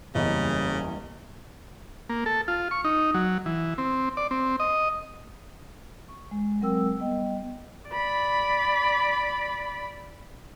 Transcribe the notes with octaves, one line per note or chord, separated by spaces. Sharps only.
F#1 E2 C#3 G3 A#3 D#5
A#3
A4
F4
C#6
D#4
F#3
E3
C4
D5
C4
D#5
C#6
G#3
F#3 G#3 C4 A#4 G5 E6
G3 B3 D#5 G5
D5 B5